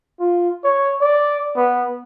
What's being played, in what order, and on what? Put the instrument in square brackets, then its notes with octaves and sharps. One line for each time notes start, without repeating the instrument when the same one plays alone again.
[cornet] F4
C#5
D5
B3